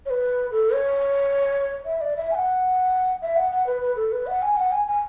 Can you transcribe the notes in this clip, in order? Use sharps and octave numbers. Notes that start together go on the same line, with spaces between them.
C#5
B4
A4
C#5
E5
D5
E5
G#5
F#5
E5
F#5
F#5
B4
B4
A4
B4
F#5
G#5
F#5
G#5
G#5